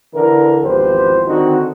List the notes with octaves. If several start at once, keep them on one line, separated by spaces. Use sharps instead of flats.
D3 E3 A#4
G#1 E2 F3 G4 B4 C5
D3 D#3 C4 D#4 F#4